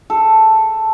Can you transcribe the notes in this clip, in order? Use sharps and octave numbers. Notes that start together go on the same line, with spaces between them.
A4